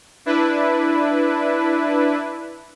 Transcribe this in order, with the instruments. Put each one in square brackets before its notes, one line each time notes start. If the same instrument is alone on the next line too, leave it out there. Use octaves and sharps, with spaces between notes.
[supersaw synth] D4 E4 B4